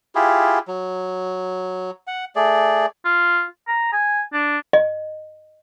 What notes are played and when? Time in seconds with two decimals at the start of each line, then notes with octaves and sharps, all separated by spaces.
0.15 E4 F4 G4 G#4
0.68 F#3
2.07 F#5
2.36 A3 G#4 D5
3.05 F4
3.68 A#5
3.93 G#5
4.33 D4
4.73 D#5